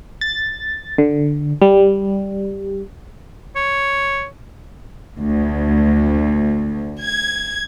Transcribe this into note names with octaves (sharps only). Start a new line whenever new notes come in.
A6
D3
G3
C#5
D2
G#6